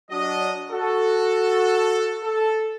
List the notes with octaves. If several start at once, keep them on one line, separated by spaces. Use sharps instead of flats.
F#3 D4 F#4 D#5
F#4 A4
A4